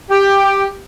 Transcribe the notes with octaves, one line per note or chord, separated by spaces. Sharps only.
G4